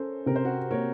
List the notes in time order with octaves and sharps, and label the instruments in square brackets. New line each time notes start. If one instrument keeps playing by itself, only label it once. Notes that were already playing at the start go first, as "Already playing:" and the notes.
Already playing: [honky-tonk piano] C#4 [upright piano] A4 A#4 C5
[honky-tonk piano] C3 [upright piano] A#4
[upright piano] C5
F#4 A#4
[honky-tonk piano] A#3 [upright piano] A#4 C#5